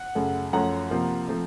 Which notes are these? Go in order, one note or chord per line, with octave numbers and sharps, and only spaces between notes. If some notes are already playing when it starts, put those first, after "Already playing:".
Already playing: F#5
F#2 C#3 A3
F#2 F3 A3 C#4 F#5 A#5
C3 F3 A#3
F3 A3 C4